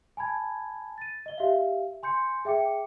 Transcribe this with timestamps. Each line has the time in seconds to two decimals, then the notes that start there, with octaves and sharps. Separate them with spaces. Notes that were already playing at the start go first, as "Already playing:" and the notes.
0.17 G#5 A5 B5 G#6
0.98 A6 D#7
1.26 D#5 G7
1.38 G4 E5 F5
2.03 G#5 C6 G6 C#7
2.45 G#4 E5 G5 D6 C#7